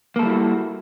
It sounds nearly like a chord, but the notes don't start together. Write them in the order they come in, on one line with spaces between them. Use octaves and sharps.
A#3 A4 G3 E4 F#4